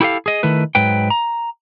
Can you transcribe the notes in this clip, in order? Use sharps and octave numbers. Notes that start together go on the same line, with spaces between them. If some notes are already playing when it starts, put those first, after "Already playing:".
E4 G4 A4 D5 F5
G#4 D#5
D#3 A3 E4 B4
G#2 F#3 B4 G5
A#5